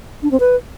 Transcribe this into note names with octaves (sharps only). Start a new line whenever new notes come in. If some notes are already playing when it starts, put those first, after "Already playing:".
D4
C4
B4